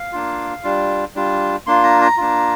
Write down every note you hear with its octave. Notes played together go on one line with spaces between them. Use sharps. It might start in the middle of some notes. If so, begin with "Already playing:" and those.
Already playing: F5
A#3 D4 F4
G3 D4 F4
G3 D4 F4
A#3 D4 F4 C6
A#5
A#5
A#3 D4 F4